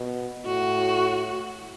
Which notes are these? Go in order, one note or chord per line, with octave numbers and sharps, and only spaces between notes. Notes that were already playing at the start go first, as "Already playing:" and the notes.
Already playing: B2
A2 F#4